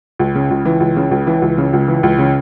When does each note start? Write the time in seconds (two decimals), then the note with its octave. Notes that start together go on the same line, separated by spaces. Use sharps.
0.19 C#2
0.35 C#3
0.50 C#2
0.65 E3
0.80 C#2
0.96 C#3
1.11 C#2
1.27 E3
1.42 C#2
1.58 C#3
1.73 C#2
1.88 E3
2.03 C#2
2.18 C#3